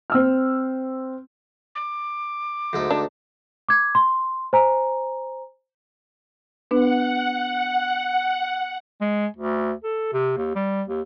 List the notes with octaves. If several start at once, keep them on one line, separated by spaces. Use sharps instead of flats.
C4 E6 F6
D6
D2 G#2 A4
D4
D6 G#6
C6
C5 G#5 A#5
B3 D4 B4 F#5
G#3
D2
A4
C3
D#2
G3
D#2